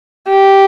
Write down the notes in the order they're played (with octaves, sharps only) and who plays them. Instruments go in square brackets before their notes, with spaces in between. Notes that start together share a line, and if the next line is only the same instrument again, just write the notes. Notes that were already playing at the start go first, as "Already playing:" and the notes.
[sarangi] G4